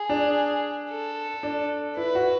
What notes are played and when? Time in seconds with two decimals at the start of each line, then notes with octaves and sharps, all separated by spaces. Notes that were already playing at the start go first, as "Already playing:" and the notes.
Already playing: G#4
0.10 D4
0.90 A4
1.43 D4
1.97 E4 B4
2.15 F#4